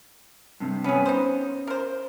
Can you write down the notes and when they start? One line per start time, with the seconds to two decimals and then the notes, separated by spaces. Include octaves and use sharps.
0.60 G2 C3
0.84 B3 C#4 G#4 B4
1.05 D#4 C5
1.67 A#4 C5